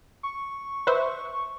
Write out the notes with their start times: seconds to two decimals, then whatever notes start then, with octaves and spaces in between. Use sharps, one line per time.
0.23 C#6
0.87 B4 C5 E5